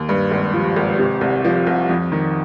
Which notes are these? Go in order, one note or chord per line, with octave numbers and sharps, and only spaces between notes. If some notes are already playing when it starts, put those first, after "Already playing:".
Already playing: D#2
G2
G#1
F3
G#1
C3
C2
F3
C2
F2
D#3